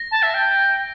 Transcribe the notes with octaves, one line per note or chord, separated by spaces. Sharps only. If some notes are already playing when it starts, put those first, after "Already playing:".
Already playing: A#6
A5
E5
G5